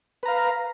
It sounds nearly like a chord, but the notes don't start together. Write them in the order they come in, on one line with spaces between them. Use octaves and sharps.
B4 A#5 F5